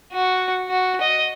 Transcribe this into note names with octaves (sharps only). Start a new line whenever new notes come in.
F#4
F#4
D#5